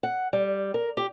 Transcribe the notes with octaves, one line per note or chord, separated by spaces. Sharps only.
F#5
G3
A#4
G4